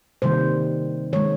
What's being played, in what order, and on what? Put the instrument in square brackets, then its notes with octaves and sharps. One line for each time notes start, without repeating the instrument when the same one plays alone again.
[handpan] C3 D#3 G3 A#3 C5
D#3 G#3 C#5